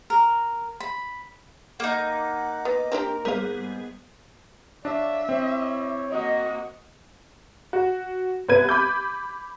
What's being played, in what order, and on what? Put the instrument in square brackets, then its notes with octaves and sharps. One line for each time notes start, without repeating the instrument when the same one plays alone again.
[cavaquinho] A#4
B5
[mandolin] A#3 D#4 [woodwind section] F#5 [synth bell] D6
[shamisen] B3 [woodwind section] D#5
[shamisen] C4 D4 G4 [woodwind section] A#4
[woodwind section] G#2 [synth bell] G3 B3 G#4 [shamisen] A#4 F5
[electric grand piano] D4 [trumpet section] C#5 D5 F5 [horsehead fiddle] E5
[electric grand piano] C4 [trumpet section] E4 C#5 D6
[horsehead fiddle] A#3 F#4 [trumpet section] D#5
[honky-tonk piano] F#4
C2 B3 B4 G#6 D#7
B5 D6 G6